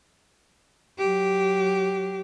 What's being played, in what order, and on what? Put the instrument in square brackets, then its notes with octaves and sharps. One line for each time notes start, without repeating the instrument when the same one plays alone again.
[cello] F#3 G4